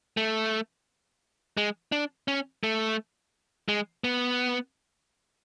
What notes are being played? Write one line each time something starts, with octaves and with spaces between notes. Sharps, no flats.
A3
G#3
D4
C#4
A3
G#3
B3